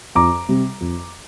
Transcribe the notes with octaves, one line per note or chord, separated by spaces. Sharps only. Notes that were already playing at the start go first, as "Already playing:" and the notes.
F2 A#5 D6
C3 G3
F2